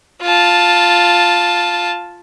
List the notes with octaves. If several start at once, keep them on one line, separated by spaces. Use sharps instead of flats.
F4 A5